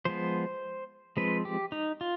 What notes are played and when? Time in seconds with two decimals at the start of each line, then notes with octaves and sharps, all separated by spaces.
0.05 F3 G#3 B3 C5
1.17 F3 G#3 C4 B4
1.45 G4
1.72 D#4
2.01 F4